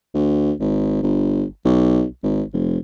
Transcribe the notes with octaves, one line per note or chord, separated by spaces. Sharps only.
D2
G#1
G1
B1
G#1
F1